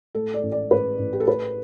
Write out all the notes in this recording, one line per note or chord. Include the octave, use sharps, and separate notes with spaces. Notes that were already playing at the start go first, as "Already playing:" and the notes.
A2 A4
D5
A1
D5
A1 B4
A1
G4
A4
A2 B4